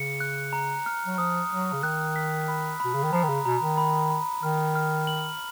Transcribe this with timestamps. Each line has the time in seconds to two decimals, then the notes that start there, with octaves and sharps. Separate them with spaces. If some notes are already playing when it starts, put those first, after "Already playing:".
Already playing: C#3 C#7
0.20 F#6
0.53 A#5
0.86 F6
1.06 F#3
1.18 F3 D#6
1.51 F#3 D#6
1.73 C#3
1.83 D#3 F#6
2.16 B6
2.48 B5
2.80 B2 B5
2.94 C#3
3.03 D#3
3.12 F3 A#5
3.23 D#3
3.29 C#3
3.46 B2 A#5
3.62 D#3
3.78 B5
4.10 B5
4.43 D#3 F6
4.76 F6
5.07 F#7